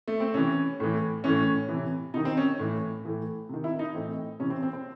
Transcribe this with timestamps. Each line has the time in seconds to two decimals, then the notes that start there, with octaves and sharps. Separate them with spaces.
0.08 A3
0.20 C4
0.34 C3 E3 C#4
0.80 A2 E3
1.24 A2 E3 C#4
1.69 C3 E3
2.14 C3 D#3 D#4
2.25 C4
2.37 C#4
2.59 A2 E3
3.05 A2 E3
3.49 C3 D#3
3.64 E4
3.79 D#4
3.94 A2 E3 C4
4.39 C3 E3 C#4
4.50 C4
4.63 C4
4.73 C4